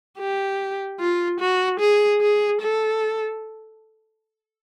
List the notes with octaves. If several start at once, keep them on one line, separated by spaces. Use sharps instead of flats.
G4
F4
F#4
G#4
G#4
A4